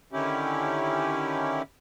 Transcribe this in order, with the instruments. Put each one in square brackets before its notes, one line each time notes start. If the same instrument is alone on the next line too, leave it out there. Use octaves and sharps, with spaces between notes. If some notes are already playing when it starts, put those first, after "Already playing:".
[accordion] D3 D#3 C#4 E4 G4